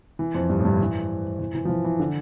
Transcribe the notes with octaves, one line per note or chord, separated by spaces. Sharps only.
E3
F2
G2
A2
G2
E3
E3
E3
F3
E3
E3
D3